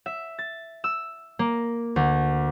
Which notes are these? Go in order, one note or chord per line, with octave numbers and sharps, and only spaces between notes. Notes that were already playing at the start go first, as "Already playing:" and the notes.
E5
A6
E6
A#3
D2